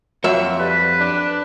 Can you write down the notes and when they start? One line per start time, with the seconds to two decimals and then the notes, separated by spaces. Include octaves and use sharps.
0.24 F2 F#3 F#4 E5
0.59 G3 B4
1.00 D4